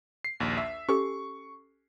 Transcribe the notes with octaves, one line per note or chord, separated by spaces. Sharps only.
C7
A#1 D#2
E5
C#4 G4 A4 C#6